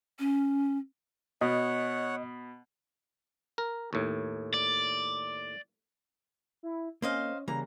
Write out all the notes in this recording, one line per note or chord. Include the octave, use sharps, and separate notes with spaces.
C#4
B2 C#5 D#5 F#5
A#4
D#2 A2
D5
E4
A#3 C4 C#4 C5 D#5 F5
C#3 E3 G3 A#3 A#5